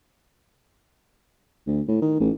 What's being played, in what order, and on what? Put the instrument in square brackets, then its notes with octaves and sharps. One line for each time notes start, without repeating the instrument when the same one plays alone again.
[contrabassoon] D2
A2
D#3
A1